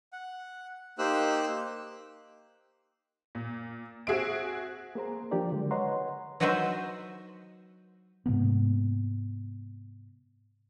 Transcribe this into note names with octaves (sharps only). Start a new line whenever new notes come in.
F#5
A#3 D#4 G4 C5 E6 F#6
A#2
C4 F#4 G#4 E5 D7
A#3 G#4 C5 A#5
F3 D4 F4 G4 A#4 D5
D3 F#3 G#3
B4 C#5 D#5 F#5 A#5 C6
F#3 D#4 F#4 B4 C5 E5
G#2 C3 A#3 B3